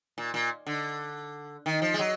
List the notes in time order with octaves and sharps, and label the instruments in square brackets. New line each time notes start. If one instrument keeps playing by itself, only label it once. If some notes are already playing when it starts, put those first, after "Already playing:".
[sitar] A#2
A#2
D3
D#3
F3
G#3
F#3